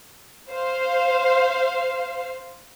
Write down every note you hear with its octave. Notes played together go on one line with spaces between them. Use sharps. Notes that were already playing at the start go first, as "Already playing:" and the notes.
C5 F5